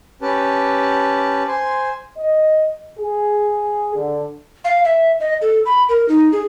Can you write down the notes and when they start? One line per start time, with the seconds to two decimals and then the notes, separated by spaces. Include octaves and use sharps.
0.22 C#4 G4 B4 A5
1.48 C5 G#5 C6
2.18 D#5
2.98 G#4
3.95 D3
4.65 F5
4.84 E5
5.20 D#5
5.42 A4
5.66 B5
5.89 A#4
6.09 D#4
6.32 G#4